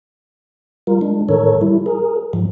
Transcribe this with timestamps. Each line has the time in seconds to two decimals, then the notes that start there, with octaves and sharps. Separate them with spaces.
0.87 G3 F4 A#4
1.01 G#3 D4
1.29 A2 D#3 A4 A#4 C#5
1.61 G3 E4
1.86 G#4 A#4
2.33 G#2 F3